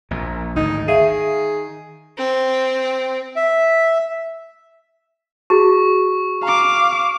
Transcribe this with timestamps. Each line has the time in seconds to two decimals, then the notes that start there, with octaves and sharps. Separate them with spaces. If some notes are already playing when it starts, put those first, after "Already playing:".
0.11 A#1 A#2
0.56 G#1 D2 A2 D#4
0.88 D#3 G#4 E5 F5
2.18 C4
3.36 E5
5.50 E4 F#4 G#4 C#6
6.43 F5 A#5 D6